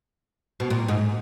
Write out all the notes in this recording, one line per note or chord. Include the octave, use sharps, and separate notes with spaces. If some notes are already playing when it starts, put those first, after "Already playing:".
B2
A#2
G#2